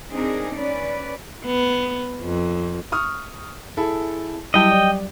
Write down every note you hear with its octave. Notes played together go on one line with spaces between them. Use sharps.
C4 D4 D#4 G#4 A#4
C#4 B4 D5
B3
F2
C#6 D#6 F6
E4 G#4 A4
F#3 G3 E4 G4 D#5 G5 A5
D5